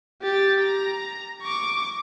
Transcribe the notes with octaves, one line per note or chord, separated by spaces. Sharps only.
G4 A6
A#5
C#6 D6